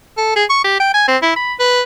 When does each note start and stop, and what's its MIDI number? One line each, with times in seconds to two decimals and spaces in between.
0.17 0.31 69
0.36 0.44 68
0.50 0.64 85
0.64 0.78 67
0.80 0.89 79
0.94 1.06 80
1.08 1.17 60
1.22 1.32 64
1.36 1.54 83
1.59 1.81 71